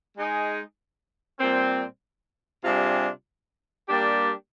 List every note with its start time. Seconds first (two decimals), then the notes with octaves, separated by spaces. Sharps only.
0.17 G#3 D#4 G#4
1.40 A#2 G3 C4
2.64 C3 G3 D4 F4 G#4
3.89 G3 A#3 D4 G4